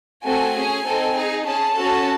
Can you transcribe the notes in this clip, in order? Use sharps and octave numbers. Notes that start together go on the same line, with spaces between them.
A3 C4 F#4 A4 G#5
C#4 G#4
C4 D#4 A4
D#4 G#4
C#4 G#4 A5
C#4 F#4 A4